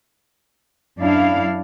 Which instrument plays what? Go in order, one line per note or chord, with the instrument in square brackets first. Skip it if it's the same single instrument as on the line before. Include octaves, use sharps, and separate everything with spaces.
[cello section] F#2 D4 E4 F5